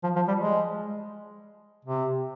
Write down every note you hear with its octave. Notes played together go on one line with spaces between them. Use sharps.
F3
F3
G3
G#3
C3